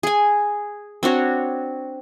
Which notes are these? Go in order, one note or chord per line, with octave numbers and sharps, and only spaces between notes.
G#4 G#5
C4 D4 F#4 C#5